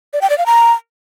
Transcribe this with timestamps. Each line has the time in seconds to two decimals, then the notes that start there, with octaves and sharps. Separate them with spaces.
0.13 D5
0.21 G5
0.30 D5
0.38 F5
0.46 A#5